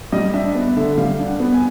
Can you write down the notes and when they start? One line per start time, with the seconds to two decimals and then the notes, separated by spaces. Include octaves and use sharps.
0.12 G3 D#5
0.34 D4 E5
0.55 B3
0.76 D3 E5
0.98 G3 F5
1.20 D4
1.26 F#5
1.40 B3
1.54 G#5